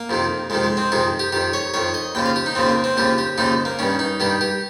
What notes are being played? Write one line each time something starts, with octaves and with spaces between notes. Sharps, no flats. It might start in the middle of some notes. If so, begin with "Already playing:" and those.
Already playing: A#3
F2 C3 D#3
F2 C3 D#3 G#3
G#3
C4
F2 C3 D#3 G#4
G4
F2 D#3 G4
C#5
F2 D#3 C#5
D#5
D#2 C#3 F3 G5
F5
G4
D#4
D#2 C#3 F3 C4
A#3
C4
D#2 C#3 F3 G4
G4
D#2 C#3 F3 D#4
A#3
G2 D#3 C#4
D#4
G2 D#3 G4
G4